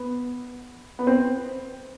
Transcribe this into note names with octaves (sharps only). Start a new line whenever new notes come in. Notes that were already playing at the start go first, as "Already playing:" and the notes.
Already playing: B3
B3
C4